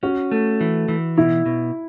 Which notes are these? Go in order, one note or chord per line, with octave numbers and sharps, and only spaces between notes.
C#4 F#4
A3
E3
E3
B2 E4
B2